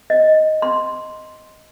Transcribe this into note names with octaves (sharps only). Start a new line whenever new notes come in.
D#5
C6